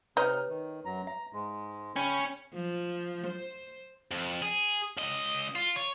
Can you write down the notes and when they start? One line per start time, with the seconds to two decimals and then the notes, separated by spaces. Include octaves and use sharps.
0.17 C3 D#4 B4 C#5 F6
0.49 D#3
0.85 F#2 F#3 A#5
1.07 E5 A#5
1.33 G#2 G#3
1.96 C#3 C#4 G5 B5
2.54 F3
3.27 C5
4.11 F2
4.42 G#4
4.97 C#2 D#5
5.56 F4
5.76 C#5